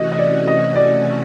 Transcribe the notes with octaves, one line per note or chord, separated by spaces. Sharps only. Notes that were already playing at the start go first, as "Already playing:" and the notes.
Already playing: C3 E3 A3 C#4 F#4 D#5
D#5
D5
D#5
D5